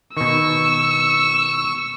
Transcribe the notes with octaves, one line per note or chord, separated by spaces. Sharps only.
B2 D#3 C#6 E6